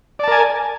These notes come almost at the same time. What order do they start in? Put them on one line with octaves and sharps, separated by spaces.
D5 A5 A#4 G#5